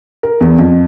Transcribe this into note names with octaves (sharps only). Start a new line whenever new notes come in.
A#4
E2
F2